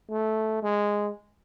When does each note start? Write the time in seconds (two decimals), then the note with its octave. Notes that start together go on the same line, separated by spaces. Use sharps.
0.10 A3
0.62 G#3